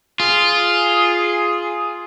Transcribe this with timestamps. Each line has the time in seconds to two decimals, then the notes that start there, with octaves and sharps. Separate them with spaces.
0.20 F4 G#4